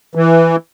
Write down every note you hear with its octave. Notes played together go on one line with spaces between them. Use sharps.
E3